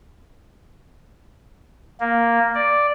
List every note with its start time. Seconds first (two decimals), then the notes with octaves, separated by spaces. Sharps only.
2.00 A#3
2.54 D5